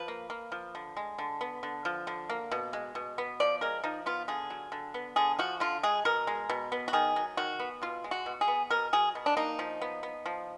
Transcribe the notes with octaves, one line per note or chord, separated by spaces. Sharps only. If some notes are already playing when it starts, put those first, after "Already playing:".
Already playing: F3 B4
A#3
A#3
F3
D3
G#3
D3
B3
D3
F3
D3
A#3
B2
G#3
B2
B3
F3 D5
G#3 A#4
F3 D#4
B3 F4
D3 G#4
F#3
D3
B3
D3 G#4
F3 F#4
D3 F4
G#3 G#4
B2 A#4
G#3
B2
B3
F#4
D#3 G#4
F#3
D#3 F#4
B3
B2 F4
G#3
F#4
B2
G#4
B3
B2 A#4
F#3 G#4
B2
D4
A#3 D#4
F3
B3
B3
F3